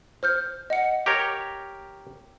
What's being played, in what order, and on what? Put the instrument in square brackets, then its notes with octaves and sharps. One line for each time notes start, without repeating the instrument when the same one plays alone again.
[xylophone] C5 F6 G6
D#5 F#5 C#7
[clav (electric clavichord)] G4 A#4 C#5